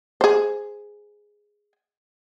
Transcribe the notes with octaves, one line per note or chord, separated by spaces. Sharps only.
G#4 C5